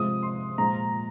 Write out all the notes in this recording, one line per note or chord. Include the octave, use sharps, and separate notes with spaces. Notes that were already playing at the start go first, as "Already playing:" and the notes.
Already playing: C3 F3 G#3 D#6
C6
A#2 F3 G#3 A#5